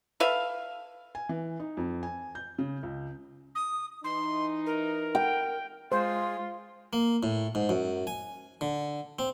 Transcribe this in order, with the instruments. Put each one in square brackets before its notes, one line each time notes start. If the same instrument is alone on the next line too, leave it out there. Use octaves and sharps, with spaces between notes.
[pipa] A4 B4 E5 F5
[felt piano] G#5
E3
D#4
F2
G#5
G6
C#3
C#2
[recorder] D#6
[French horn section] E3 D#4 [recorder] C6
[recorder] A#4
[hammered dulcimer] G5
[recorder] G#3 [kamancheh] F4 [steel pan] C5
[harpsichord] A#3
A2
G#2
F#2
G#5
D3
C4